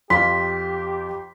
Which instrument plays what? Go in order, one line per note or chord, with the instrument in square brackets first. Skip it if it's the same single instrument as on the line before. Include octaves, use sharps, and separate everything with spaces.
[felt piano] F2 F5 [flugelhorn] G4 [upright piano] C6 [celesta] B6